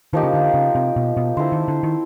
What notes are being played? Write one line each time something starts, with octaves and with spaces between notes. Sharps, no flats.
D#3 F3 A#3 D#4 G4
C#3
D3
C#3
C3
B2
B2
D3 C4 E4 A4 C5
D#3
D3
D#3